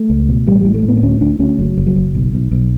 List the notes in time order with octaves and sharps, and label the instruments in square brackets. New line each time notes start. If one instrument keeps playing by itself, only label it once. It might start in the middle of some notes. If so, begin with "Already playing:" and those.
Already playing: [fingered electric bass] A3
C#2
B2
A1 G3
A2 G3
A3
A2 B3
B3
D2 C#4
D2 D4
D2 C#4
F#1 F#3
F#1
F#3
F#1
B1
B1
B1